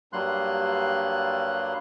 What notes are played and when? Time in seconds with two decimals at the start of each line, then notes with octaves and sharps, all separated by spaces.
0.13 G2 F#3 G3 A#3 C6 F#6